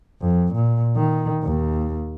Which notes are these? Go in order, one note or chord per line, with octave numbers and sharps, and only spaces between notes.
F2
A#2
D#3
D#2